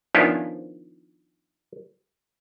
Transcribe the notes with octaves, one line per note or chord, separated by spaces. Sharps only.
D#3 F3 B3 C#4 D4 E4